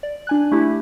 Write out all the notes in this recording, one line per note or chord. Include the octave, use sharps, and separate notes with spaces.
D5
D4 G#5 F#6
A3 E4 G4